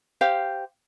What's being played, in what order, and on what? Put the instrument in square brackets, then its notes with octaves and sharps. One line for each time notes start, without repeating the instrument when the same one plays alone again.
[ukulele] G4 C5 F5